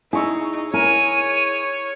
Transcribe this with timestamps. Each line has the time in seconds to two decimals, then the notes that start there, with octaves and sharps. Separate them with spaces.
0.13 D#4 E4 G#4 C#6 E6
0.74 E4 A#4 C#5 G#5 D#7